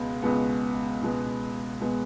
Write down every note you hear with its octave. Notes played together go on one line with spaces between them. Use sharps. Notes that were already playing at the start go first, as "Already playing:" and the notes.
Already playing: C#2 B2 G#3 B3
C#2 B2 G#3 B3
C#2 B2 G#3 B3
B2 G#3 B3